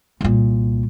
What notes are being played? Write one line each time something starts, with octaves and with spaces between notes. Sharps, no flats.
C2 A#2